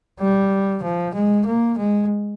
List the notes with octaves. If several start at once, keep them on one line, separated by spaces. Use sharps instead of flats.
G3
F3
G#3
A#3
G#3